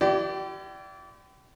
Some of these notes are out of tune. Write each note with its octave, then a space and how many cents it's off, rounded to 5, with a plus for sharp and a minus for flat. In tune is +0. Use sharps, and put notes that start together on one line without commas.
E4 +35 G4 -35 D5 +0